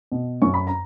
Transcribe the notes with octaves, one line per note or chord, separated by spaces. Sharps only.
B2
F#2 C#6
B5
A#5